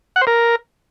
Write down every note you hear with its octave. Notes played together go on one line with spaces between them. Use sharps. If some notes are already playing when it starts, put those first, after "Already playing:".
F#5
C5
A#4